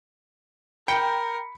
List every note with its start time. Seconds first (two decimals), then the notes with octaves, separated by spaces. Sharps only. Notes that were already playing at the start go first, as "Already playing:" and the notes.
0.88 A#4 G5 B5 C#7